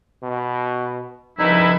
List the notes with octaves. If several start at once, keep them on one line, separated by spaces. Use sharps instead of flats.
B2
C2 C#3 F3 D#4 E4 B4